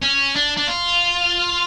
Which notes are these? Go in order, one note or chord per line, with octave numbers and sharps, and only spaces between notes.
C#4
D4
D4
F4